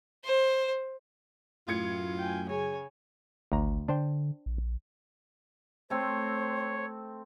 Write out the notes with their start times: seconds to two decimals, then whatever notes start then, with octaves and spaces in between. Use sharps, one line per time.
0.25 C5
1.68 F#2 A2 F4 G#6 C#7
2.19 G5 G#5
2.49 C#3 C#5 G#5
3.52 G#1 D2 A#5
3.88 D3 D4 C5 G5
4.46 A#1
5.90 A3 C4 C5 C#5